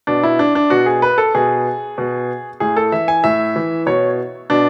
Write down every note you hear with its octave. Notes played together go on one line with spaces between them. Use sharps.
B2 D4
E4
D4
D4
B2 F#4
G#4
B4
A4
B2 G#4
B2
A2 G#4
A4
E3 E5
G#5
A2 E5
E3
B2 C#5
B2 D4